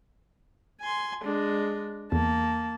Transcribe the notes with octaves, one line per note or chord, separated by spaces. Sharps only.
G#5 C6
G#3 D4
E2 A#3 A5